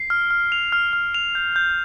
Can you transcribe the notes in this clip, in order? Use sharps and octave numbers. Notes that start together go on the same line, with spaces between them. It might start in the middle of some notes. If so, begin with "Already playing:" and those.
Already playing: C7
F6
F6
F7
F6
F6
F7
G6
G6